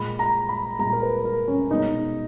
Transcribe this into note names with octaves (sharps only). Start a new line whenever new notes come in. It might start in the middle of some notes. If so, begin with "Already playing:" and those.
Already playing: A#2 G#3 B5
A#5
B5
A#2 G#3 A#5
A#4
B4
A#4
C#4
B2 G#3 D#4